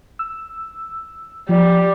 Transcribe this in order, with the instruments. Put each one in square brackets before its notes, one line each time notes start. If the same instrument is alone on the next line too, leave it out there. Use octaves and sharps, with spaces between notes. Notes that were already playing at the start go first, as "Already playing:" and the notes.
[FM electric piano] E6
[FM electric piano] F3 [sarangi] G3